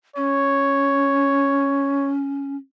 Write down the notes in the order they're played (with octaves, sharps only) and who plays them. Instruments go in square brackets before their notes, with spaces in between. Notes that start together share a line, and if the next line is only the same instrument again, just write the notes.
[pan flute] C#4 [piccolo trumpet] C#5